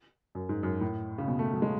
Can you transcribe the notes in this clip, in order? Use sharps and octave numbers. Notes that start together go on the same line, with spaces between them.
F#2
G#2
F#2
A2
C#3
B2
A3
F#3
G#3